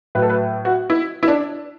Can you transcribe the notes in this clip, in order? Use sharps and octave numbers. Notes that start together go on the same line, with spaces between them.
A2 F#3 B4
A4
B4
F#4
E4
E4
D4